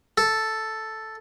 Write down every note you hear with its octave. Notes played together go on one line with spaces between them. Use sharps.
A4